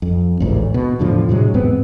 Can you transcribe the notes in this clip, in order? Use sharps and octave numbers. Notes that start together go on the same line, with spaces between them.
F2
A1 D2 G#2
B2
E2 A2 D3 F3
A2 C3 F#3 G#3
E2 G#2 B3 C4